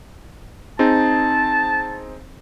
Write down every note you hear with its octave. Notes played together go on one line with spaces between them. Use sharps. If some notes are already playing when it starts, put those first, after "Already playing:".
C4 D#4 G#4 A5